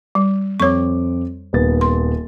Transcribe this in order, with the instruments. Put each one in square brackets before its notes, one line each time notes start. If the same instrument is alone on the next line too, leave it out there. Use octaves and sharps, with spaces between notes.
[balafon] G3
[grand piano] F2 C4 D6 [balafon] C#5 C#6
[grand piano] D#1 B3 A6
[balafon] C6